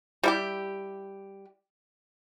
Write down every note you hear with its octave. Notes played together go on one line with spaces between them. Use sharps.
G3 E4 G4